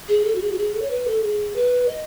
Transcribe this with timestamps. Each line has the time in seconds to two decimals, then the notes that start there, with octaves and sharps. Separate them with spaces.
0.08 G#4
0.25 A4
0.35 F#4
0.42 G#4
0.52 F#4
0.58 G#4
0.75 A4
0.82 C#5
0.90 B4
1.07 A4
1.23 G#4
1.56 B4
1.88 D#5